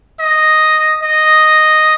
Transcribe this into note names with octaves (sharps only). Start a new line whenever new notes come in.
D#5
D#5